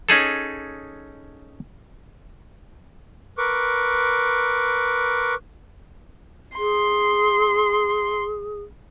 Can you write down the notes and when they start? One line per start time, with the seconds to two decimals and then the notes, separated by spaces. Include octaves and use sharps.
0.09 C#4 D#4 G#4 A4
3.38 A#4 B4 C#6 D6
6.58 G#4 C6